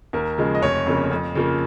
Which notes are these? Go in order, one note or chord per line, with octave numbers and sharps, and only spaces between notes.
D#2 A#4
C#3 F3 G#3
D#5
F1 C#5
F2 C#3 A#3
F2
C#3 F3 A#3